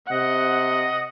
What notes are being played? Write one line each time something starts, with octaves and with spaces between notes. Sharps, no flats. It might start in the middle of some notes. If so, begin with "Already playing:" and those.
C3 D#5 F#5